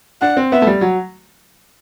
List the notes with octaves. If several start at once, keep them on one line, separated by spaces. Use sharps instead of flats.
D4 F#5
C4
B3 E5
A3
G3
F#3